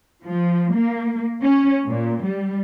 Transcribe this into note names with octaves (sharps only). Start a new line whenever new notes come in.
F3
A#3
C#4
A#2
G3